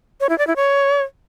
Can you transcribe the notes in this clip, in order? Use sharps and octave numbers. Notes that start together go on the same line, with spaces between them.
C#5
E4
D5
E4
C#5